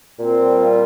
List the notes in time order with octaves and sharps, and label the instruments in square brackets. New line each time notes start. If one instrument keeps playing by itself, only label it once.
[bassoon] A#2 [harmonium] C4
[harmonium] G3
F4